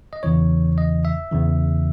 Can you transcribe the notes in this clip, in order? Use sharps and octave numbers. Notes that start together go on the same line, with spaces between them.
D#5
E2 C#3 E3 C#5
D#5
E5
E2 C#3 E3